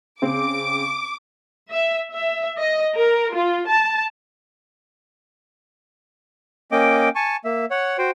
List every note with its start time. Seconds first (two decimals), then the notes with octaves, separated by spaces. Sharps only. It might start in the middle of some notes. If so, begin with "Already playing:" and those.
0.22 C#3 C4 D6
1.71 E5
2.12 E5
2.59 D#5
2.98 A#4
3.35 F4
3.67 A5
6.72 A#3 C#4 D#5 G5 D6
7.15 G#5 A5 C#6
7.45 A#3 E5
7.71 C#5 F#5
7.98 F#4 C5 G5